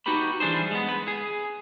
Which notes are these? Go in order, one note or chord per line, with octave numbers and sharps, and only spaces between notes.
D#4 F#4 G4 B4 B5
E3 G3 D4 G#4 C5
G#3 B3
B4
G#4